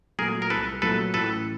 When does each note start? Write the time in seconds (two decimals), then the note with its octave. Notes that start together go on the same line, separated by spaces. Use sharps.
0.18 A#2 F#3 A3 G#4 A#4
0.42 A#4
0.50 C2 A4 B4
0.82 A#2 F#3 A3 A4 B4
1.14 A1 A4 B4